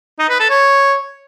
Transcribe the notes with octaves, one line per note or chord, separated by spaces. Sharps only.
D#4
B4
A4
C#5